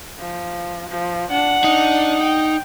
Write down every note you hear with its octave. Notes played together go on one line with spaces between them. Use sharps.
F3
F3
D4 F#5
D4 D#4
G5